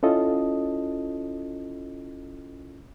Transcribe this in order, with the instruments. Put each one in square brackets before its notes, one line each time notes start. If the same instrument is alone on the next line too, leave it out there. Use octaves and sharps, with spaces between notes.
[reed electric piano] C#4 E4 F4 A4 D#5